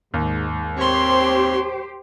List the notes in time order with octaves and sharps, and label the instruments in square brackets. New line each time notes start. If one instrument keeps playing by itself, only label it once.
[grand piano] D#2 [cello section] G#2
[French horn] C4 [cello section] G4 C5 [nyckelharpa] C#5 C6